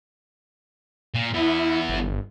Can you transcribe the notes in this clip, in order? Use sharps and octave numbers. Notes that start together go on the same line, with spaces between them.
A#2
E3 B3 E4
G1